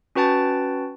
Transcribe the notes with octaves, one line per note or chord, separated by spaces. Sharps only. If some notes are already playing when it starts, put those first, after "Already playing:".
C#4 F#4 B4 G5 A5 A6